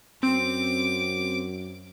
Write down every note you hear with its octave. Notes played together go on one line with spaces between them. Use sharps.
F#2 C4 D6